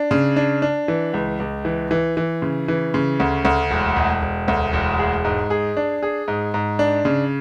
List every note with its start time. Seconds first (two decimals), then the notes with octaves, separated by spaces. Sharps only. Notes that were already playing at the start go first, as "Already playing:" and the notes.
Already playing: D4
0.11 C#3
0.36 D4
0.62 D4
0.88 E3
1.14 C#2
1.40 C#2
1.65 E3
1.91 E3
2.17 E3
2.42 C#3
2.68 E3
2.94 C#3
3.20 D2
3.45 D2
3.71 E1
3.96 E1
4.22 E1
4.48 D2
4.73 E1
4.99 G#4
5.25 G#2
5.50 G#4
5.77 D4
6.03 G#4
6.28 G#2
6.54 G#2
6.79 D4
7.05 C#3